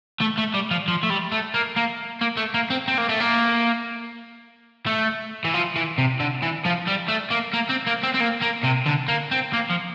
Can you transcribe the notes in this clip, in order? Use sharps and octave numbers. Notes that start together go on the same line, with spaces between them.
A3
A3
G3
F3
F3
A3
G3
A3
A#3
A#3
A#3
A3
A#3
C4
C4
A#3
A3
A#3
A3
E3
F3
E3
C3
D3
E3
F3
G3
A3
A#3
A#3
C4
A#3
C4
C4
A#3
A#3
C3
D3
A#3
C4
A#3
F3